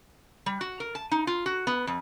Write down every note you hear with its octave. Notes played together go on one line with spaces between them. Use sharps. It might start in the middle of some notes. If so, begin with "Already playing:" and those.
G3
F#4
A#4
A5
D#4
F4
F#4
B3
F2